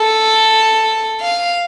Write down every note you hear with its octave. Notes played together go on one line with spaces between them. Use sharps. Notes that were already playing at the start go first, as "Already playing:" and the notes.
Already playing: A4
F5